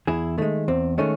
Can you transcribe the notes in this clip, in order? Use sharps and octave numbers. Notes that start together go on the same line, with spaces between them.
E2 E4 G#4
D#3 G#3 A3
E2 C4
D#3 G#3 A3 C#4